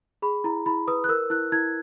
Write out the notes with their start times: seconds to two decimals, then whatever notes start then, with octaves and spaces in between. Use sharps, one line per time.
0.22 G#4 B5
0.44 E4 A#5
0.66 E4 B5
0.88 B4 D#6
1.04 F#6
1.09 A#4 E6
1.30 E4 F#6
1.52 E4 G#6